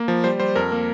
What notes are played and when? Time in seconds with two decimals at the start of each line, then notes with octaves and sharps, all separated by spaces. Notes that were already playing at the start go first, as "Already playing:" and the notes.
Already playing: A#3
0.08 F3
0.24 G3 C5
0.40 G3 C5
0.55 F2 A#4
0.72 A#3